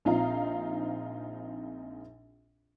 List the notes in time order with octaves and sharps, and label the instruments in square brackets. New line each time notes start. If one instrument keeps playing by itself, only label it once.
[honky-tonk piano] A#1 C4 D#4 F4 F5 A#5